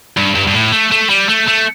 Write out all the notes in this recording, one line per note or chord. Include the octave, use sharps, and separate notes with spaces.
G2
G2
G2
A2
A3
A3
G3
A3
A3